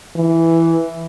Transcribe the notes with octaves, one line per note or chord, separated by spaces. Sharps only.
E3